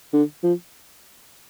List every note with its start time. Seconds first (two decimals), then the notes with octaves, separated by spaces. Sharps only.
0.13 D3
0.43 F3